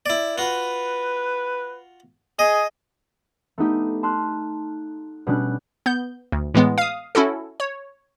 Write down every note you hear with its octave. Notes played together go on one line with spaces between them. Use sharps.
E4 D5
F4 F#4 B4
G#4 D#5
A3 B3 D#4 G4
A5 C6 F6 F#6
B2 G3 C#4 D4 D6 F#6
B3 G6
D2
A2 E3 G#3 B3
F5 D#6
C#4 E4 F#4 A4
C#5